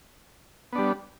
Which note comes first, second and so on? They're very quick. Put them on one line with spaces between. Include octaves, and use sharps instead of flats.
B3 D4 G3